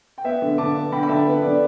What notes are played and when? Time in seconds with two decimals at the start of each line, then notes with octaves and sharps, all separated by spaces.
0.18 G5
0.24 B3 B4 E5
0.42 D3
0.58 D3 A5 D6
0.75 B3
0.92 D3 G5 B5
1.03 B5
1.08 D3 E5 A5
1.25 B3 B4
1.42 D3 D5